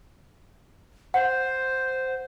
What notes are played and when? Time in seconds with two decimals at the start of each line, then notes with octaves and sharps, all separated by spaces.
1.14 C5 F#5